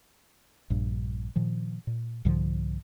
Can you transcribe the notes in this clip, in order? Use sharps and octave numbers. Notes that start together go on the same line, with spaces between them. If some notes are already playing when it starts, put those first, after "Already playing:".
A#1 G2
A#2 D#3 F3
A#2
C2 G#2 D3 F3